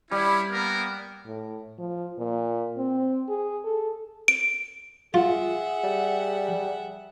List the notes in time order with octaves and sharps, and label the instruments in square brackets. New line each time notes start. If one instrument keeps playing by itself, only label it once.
[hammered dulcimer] G3 [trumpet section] C#4 E4
[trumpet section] A#3 B3 A#4
[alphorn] A2
F3
A#2
C4
G#4
A4
[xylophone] D7
[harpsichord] F4 [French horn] G#4 [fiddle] E5 F#5
[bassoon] G3